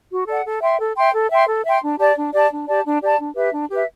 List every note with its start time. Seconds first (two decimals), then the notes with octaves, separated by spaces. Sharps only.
0.11 F#4
0.27 A4 D5 F#5
0.45 A4
0.62 E5 G5 C6
0.80 A4
0.96 E5 G5 C6
1.13 A4
1.30 E5 G5 C6
1.48 A4
1.64 E5 G5 C6
1.82 D4
1.99 G4 D5 A5
2.16 D4
2.33 G4 D5 A5
2.50 D4
2.67 G4 D5 A5
2.84 D4
3.01 G4 D5 A5
3.19 D4
3.35 G4 B4 E5
3.53 D4
3.70 G4 B4 E5